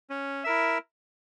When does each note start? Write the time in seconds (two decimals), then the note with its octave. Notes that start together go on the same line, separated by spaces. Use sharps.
0.10 C#4
0.44 E4 A#4 E5